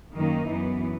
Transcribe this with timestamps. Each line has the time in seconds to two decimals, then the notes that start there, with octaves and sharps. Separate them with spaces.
0.13 F#2 D#3 A#3 D#4
0.48 F#2 E3 B3